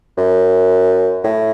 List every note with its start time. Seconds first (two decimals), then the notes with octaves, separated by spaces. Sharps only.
0.17 F#2
1.24 A2